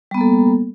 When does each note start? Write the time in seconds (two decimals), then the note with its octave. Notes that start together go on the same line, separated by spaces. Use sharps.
0.11 G3
0.14 B3
0.18 A#3
0.21 A4